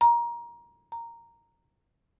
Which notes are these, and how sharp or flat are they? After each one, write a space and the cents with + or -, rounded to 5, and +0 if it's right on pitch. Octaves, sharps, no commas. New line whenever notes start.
A#5 +20
A#5 -5